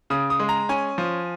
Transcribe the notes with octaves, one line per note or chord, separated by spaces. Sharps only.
C#3 D#6
D#6
G#3
A#5
C#4 G#5
F3